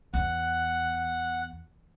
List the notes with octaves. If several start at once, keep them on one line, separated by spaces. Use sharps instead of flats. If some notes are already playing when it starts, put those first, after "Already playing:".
E2 F#5